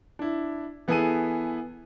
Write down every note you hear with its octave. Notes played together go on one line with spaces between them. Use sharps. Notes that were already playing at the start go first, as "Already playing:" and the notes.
D4 E4
E3 B3 E4 G#4 A4 D#7